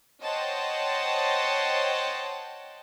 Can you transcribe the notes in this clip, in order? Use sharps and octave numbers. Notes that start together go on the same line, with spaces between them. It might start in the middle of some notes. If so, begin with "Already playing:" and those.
C5 C#5 D#5 F#5 G5 A5